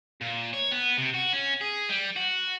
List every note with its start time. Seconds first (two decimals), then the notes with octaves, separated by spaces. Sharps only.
0.21 A#2
0.53 C#5
0.71 B3
0.97 C3
1.14 F#4
1.33 C#4
1.61 G#4
1.89 G3
2.16 F#4